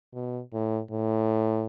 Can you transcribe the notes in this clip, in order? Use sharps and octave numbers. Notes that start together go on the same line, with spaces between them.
B2
A2
A2